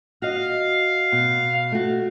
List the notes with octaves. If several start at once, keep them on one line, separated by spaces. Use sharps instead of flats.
F#4 D#5 F5
B2
A3 F#4